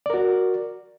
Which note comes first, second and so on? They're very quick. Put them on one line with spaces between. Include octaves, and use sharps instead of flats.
D5 A#4 F#4